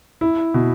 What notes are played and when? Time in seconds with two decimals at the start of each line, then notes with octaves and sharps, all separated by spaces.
0.21 E4
0.54 B2